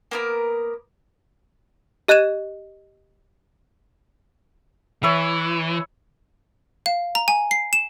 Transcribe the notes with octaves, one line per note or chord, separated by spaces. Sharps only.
A#3 B3 A#4
G4 D#5 F#6 G#6 D#7 E7
E3 C#5 E5 B5
F5
A#5
G#5
C7
E7